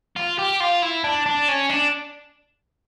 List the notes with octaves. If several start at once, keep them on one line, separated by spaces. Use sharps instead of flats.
F4
G4
F4
E4
D4
D4
C#4
D4